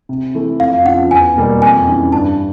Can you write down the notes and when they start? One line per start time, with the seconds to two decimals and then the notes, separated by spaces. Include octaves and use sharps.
0.09 C3
0.35 E3 A3
0.60 F2 F5
0.85 C#3 F3 F#5
1.11 E2 G#5
1.37 B2 G3 A#3
1.62 F2 G#5
1.88 C#3 E3
2.12 G2 A5